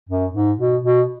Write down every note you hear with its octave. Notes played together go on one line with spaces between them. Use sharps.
F#2
G#2
B2
B2